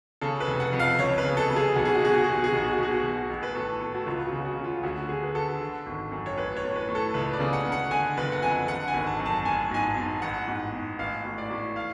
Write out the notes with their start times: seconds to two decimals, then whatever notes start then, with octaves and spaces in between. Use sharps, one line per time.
0.21 C#3 A4
0.40 B4
0.47 F1
0.60 F#5
0.72 F2
0.80 F5
0.99 C#2 C#5
1.18 B4
1.24 C#3
1.37 A4
1.50 C#3
1.56 G#4
1.76 B1 F#4
1.85 G#4
1.95 F#4
2.01 B2 G#4
2.15 F#4
2.24 B2 G#4
2.34 F#4
2.44 G#4
2.52 B1 F#4
2.64 G#4
2.73 F#4
2.78 B2 G#4
2.93 F#4
3.03 B2
3.30 A1
3.43 B4
3.55 A2 A4
3.81 A2 A4
3.95 F#4
4.06 C#2 F4
4.26 F#4
4.32 C#3
4.45 F#4
4.58 C#3
4.64 F4
4.83 D2 F#4
5.09 D3 G#4
5.23 B4
5.35 D3 A4
5.60 D3
5.86 G#1
6.12 F#2
6.26 C#5
6.37 A1 B4
6.57 C#5
6.63 A2
6.76 B4
6.89 A2
6.95 A4
7.14 C#2 B4
7.33 D5
7.40 C#3
7.53 F#5
7.66 C#3
7.72 F#5
7.91 D3 G#5
8.17 F#1 B4
8.32 F#5
8.42 F2 G#5
8.68 D3 F#5
8.88 G#5
8.94 G#1
9.07 A5
9.20 F#2
9.26 A5
9.45 A1 G#5
9.71 G#2 G#5
9.84 A5
9.97 G#2
10.22 A1 F#5
10.48 G#2
10.73 G#2
10.99 A1 F5
11.25 A2
11.38 D5
11.51 A2
11.76 F5